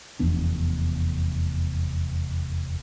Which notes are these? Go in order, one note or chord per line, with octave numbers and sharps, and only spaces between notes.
F1 E2 B3 D4